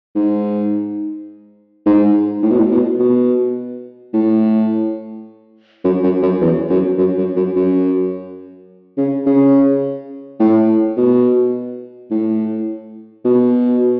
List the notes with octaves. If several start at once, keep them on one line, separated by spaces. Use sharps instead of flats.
G#2
G#2
A2
B2
A2
B2
B2
A2
F#2
F#2
F#2
E2
F#2
F#2
F#2
F#2
F#2
C#3
C#3
A2
B2
A2
B2